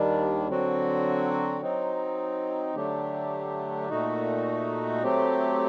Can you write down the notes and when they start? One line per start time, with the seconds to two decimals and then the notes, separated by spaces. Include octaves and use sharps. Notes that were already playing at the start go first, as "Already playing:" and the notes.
Already playing: D#2 D#3 G3 D4
0.48 D3 F#3 C4 F#4
1.61 F#3 C4 D#4
2.75 D3 F#3 A3 D4 G4
3.89 A#2 A3 D#4 F#4
5.03 F#3 A3 C4 G4